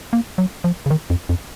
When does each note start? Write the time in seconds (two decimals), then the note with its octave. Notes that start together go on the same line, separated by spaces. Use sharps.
0.13 A#3
0.38 F#3
0.64 F3
0.86 C#3
0.90 D#3
1.10 F2
1.29 F2